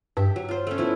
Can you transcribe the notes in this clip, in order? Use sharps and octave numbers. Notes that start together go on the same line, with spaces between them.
G2 G4 E5
F#3
F4 C5
A3 C#4
F3 B3 E4